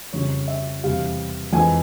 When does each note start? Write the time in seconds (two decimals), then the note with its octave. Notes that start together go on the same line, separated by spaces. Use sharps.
0.13 F2 C#3 G3 C#5
0.48 E5
0.83 E2 C3 G3 F5
1.53 F2 E3 G#3 G#5